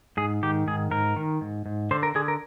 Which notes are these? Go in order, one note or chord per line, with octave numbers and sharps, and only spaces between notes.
G#2 G#4
D#3 G4
G#2 G#4
G#2 A#4
D#3
G#2
G#2
D3 C5
A#4
D3 G#4
A#4